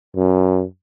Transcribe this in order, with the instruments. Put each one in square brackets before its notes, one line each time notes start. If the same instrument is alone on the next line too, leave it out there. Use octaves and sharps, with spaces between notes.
[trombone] F#2